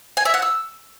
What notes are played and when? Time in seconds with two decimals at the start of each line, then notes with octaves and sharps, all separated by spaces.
0.17 G#5
0.25 E5
0.34 F#5
0.42 E6